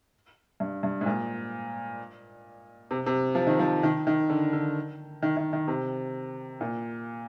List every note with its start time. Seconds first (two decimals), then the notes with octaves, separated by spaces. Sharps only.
0.60 G2
0.83 G2
1.01 G#2
1.06 A#2
2.91 C3
3.06 C3
3.35 F3
3.47 D#3
3.59 F3
3.83 D#3
4.07 D#3
4.30 D3
4.53 D3
5.22 D#3
5.37 D#3
5.53 D#3
5.68 C3
6.61 A#2